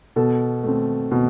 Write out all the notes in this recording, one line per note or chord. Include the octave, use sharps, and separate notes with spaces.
B2 A4
A3 C4
B2